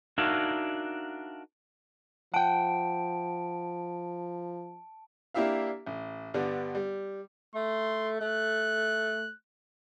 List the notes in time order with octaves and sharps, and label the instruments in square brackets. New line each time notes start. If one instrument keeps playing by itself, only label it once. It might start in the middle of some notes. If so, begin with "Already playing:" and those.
[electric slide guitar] D4 D#4 F#4 A#4 E5 F5
[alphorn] F3 [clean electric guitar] F#5 G5 [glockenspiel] A5 D7
[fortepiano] A#3 D4 E4 G4 E5 F5
A1
G2 D3 G3 B3
G3
[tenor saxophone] A3 [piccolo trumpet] C6
[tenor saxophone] A3 [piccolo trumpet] F#6